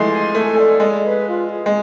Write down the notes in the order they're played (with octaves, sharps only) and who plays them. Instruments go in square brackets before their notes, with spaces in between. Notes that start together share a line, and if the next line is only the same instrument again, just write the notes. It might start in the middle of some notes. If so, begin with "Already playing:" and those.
Already playing: [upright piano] E3 F3 G#3 A3 [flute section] C6
[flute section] G#5
[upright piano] A3 [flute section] A4
[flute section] D5
[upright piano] G#3 [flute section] D5
[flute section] B4
F4
G#4
[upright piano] G#3